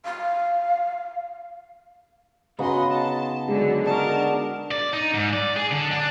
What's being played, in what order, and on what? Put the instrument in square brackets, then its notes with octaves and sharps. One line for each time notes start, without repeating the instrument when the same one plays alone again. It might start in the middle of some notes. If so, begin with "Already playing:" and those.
[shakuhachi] F5
[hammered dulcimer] C#3 B3 D#4 [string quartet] F#4 D#5 C6
[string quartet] A5
[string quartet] D3 F#3 [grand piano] G#3
[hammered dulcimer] D4 D#4 F#4 [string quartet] A#4 A5
[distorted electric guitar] D5
D#4
G#2
D5
G#4
D3
D4